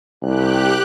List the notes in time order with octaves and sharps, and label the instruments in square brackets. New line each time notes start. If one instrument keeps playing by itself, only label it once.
[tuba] C2 [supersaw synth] G4 F#6